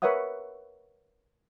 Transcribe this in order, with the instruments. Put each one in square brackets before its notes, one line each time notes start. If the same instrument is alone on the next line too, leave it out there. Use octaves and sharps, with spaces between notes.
[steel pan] A#4 B4 C#5 E5 F#5 D#6